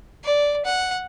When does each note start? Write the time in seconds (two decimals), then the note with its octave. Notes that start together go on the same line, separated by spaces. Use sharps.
0.24 D5
0.65 F#5